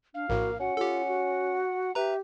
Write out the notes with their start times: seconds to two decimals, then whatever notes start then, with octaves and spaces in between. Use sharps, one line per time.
0.14 D4 F5
0.30 A#1 A2 A#3 F#4
0.60 C#4 F#4 F#5
0.77 F4 G4 A4
1.07 F#4
1.95 G4 B4 E5 A#5